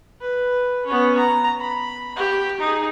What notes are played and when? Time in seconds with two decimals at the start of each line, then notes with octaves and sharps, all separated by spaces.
0.21 B4
0.86 B3 C#4
1.17 A#5
1.60 B5
2.16 G4
2.60 D#4 G#4